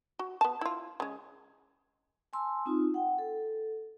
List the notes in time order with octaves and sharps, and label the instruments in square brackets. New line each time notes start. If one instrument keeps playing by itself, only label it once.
[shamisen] F#4
B3 A5
E4 F4
C#3 G#3
[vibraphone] G#5 A5 C6 E6
C4 D#4 F4
F#5 G5
A4